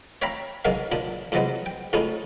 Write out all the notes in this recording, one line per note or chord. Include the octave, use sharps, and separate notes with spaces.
C#5 E5 F5 G5 A#5 B5
G#2 B2 F#3 A#3 C#4 F5
D#2 A#2 D4
E2 G2 C3 F#3 G#3 B3
G5
G#2 A3 C#4 D#4 E4